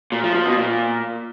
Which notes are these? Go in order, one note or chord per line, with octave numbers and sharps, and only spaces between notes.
A#2
F3
F3
B2
A#2